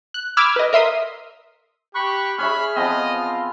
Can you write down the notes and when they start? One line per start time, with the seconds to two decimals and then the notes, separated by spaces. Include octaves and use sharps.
0.14 F#6
0.37 B5 D6 E6 F6 G#6
0.56 B4 D#5
0.73 A#4 E5 C6 D#6
1.95 G4 B5 C#6 F#6
2.38 G#4 C#5 E5 B5 F6
2.76 F3 B3 C4 D#5
3.22 F4